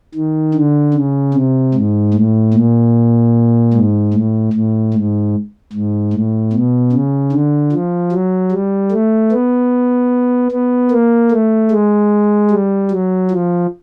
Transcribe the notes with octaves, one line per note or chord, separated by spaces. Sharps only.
D#3
D3
C#3
C3
G#2
A2
A#2
G#2
A2
A2
G#2
G#2
A2
B2
C#3
D3
F3
F#3
G3
A3
B3
B3
A#3
A3
G#3
G3
F#3
F3